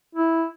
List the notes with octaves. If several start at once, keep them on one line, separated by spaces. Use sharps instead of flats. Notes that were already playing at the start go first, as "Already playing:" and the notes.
E4